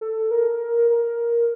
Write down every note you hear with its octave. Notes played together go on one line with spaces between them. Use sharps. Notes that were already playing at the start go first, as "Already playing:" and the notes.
A4
A#4
A#4